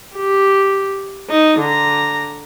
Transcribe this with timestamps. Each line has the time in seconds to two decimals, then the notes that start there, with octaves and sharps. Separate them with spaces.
0.15 G4
1.30 D#4
1.59 D3 A#5